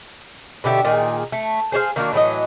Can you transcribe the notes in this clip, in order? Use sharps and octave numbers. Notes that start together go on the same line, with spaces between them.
B2 D3 G4 E5
A#2 D#3 G#4
A3
G#4 C5 C#5 F5
D#3 A#3 D4 F#4
A2 E3 F#3 D#5